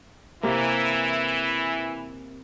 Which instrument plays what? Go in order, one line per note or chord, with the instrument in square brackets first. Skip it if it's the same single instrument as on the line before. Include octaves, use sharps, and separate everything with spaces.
[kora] C3 A#3 [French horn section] E3 E4